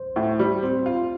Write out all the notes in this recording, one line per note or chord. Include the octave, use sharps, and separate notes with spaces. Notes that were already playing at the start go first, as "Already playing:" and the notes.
Already playing: C5
A2
G3
C4
F4